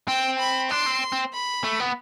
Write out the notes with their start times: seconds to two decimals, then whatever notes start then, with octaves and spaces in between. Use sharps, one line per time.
0.08 C4 G5
0.39 B5
0.70 D4 C6
0.86 C4
1.12 C4
1.33 B5
1.64 A3
1.80 B3